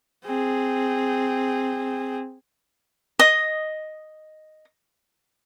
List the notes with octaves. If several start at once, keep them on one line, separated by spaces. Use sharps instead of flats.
C4 G#4
D#5 D#6